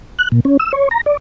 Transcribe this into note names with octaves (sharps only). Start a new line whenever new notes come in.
F#6
A#2
C#4
E6
C#5
A#5
D5